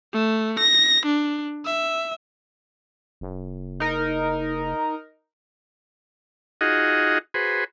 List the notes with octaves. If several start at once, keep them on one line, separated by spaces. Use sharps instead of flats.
A3
A#6
D4
E5
F#1
D#4 A#4
D#4 F4 F#4 G#4 D#5 F#5
F#4 G#4 B4 C5